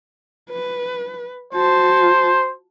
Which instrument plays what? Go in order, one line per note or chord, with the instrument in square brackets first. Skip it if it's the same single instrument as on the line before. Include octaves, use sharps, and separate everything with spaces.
[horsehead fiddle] B4
[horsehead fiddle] F#4 A5 [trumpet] C5